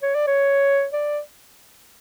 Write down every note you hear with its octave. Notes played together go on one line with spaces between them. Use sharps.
C#5
D5
C#5
D5